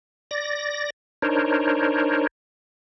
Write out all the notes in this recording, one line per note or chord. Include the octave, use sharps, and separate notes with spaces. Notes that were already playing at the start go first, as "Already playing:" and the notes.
D5 A#6
D4 D#4 A#4 C5 C#5